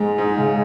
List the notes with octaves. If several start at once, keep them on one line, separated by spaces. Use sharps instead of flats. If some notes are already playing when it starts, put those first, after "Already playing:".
Already playing: G#2 G#3
G#2
C#3